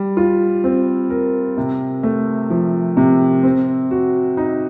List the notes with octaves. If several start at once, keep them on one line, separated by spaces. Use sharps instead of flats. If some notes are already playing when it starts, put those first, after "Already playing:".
Already playing: G3
F4
C4
A#4
C3
A3
F3
C3
C4
F#4
D#4